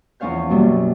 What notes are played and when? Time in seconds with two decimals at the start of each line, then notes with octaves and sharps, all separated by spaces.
0.20 E2 F3 C#4 C#5 F5 G6
0.50 F#2 B2 F#3 G3 A#3